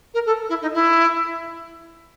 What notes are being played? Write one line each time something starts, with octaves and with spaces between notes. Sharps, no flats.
A#4
A4
E4
D#4
E4